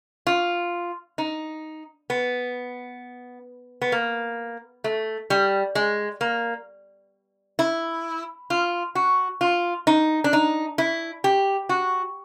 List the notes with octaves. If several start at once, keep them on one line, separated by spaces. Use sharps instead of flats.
F4
D#4
B3
B3
A#3
A3
G3
G#3
A#3
E4
F4
F#4
F4
D#4
D4
D#4
E4
G4
F#4